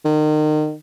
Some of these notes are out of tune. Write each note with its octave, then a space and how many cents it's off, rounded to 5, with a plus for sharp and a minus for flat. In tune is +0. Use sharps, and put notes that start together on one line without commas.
D#3 -30